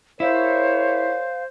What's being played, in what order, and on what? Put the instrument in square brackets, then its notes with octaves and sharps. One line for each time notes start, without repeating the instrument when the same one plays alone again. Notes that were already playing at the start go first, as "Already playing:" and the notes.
[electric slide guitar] E4 [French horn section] G#4 A#4 C#5 [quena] C5 [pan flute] F5